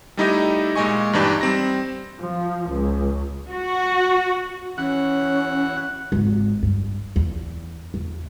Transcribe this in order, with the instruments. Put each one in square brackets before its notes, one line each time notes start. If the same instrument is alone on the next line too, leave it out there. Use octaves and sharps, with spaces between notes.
[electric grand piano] G3 A3 D#4 E4 G4 D#5
A#2 G#3 D#5 G#5 C#6
G2 E3 D4 D#4 G4
G3 C4 A#6
[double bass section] F3
C#2
[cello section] F#4
[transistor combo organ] E3 F#4 F#5 [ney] C#4
[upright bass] G#1
G2
E2
E2